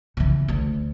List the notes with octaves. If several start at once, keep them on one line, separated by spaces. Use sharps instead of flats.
C#3 E3
D2